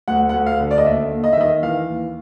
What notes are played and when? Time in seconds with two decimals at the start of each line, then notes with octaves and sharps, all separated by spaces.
0.08 D2 F#5
0.29 F#5
0.33 D2
0.46 F5
0.60 D3
0.71 D5
0.78 D#5
0.85 D#2 E5
1.11 D#2
1.24 D#5
1.33 E5
1.37 D#3 D#5
1.63 E3 F5
1.89 D#2